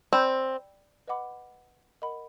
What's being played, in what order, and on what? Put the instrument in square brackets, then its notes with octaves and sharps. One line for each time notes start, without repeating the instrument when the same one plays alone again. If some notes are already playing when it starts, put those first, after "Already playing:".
[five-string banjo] C4 [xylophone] D5 G5 B5 E6 G6
[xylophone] B4 D#5 F#5 B5 D6
A#4 D#5 F#5 B5